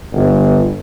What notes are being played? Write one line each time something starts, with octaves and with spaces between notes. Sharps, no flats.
G1